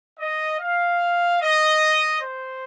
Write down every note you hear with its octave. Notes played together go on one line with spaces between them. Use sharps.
D#5
F5
D#5
C5